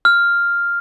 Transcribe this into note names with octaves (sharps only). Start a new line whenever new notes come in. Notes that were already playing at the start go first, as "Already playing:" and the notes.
F6